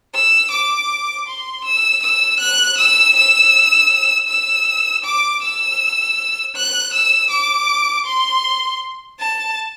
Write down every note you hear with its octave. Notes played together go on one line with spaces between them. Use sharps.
E6
D6
C6
E6
E6
F#6
E6
E6
E6
D6
E6
F#6
E6
D6
C6
A5